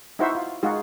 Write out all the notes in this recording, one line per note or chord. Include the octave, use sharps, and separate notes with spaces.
D#4 E4 F#4 C5 E5
F4
G#3 D#4 F4 F#4 G#4